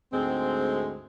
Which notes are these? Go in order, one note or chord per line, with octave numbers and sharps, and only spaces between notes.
D2 G#2 G#3 C4